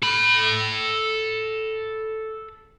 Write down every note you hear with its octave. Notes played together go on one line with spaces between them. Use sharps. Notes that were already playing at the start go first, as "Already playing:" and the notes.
A4 B5